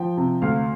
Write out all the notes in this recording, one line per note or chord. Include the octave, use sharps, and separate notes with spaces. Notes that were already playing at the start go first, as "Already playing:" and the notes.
Already playing: F3 G5
C3
D2 F5